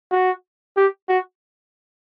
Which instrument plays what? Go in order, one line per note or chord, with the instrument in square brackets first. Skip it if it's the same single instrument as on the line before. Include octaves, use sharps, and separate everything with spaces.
[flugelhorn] F#4
G4
F#4